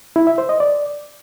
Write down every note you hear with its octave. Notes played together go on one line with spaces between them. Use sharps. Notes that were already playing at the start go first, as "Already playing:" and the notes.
E4
E5
C5
D#5
D5